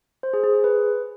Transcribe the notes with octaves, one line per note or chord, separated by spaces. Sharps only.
C5
G#4
G#4
G#4
B4